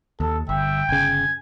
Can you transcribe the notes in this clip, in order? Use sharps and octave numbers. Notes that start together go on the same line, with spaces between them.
D#2 A4
G1 E5 G5
G1 C#3 G#5